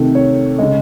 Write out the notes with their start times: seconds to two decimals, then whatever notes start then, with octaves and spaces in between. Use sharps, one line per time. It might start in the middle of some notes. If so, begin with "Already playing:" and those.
Already playing: C3 D#3 A3
0.15 C#5
0.58 C#3 G#3 D#5